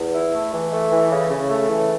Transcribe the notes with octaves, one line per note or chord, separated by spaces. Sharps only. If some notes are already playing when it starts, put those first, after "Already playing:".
Already playing: E2
E4
A3
E3
A3
E3
C#3
C#3
A3
E3